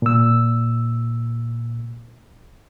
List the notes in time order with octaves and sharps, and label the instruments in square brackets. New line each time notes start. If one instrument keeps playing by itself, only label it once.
[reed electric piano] A#2 E6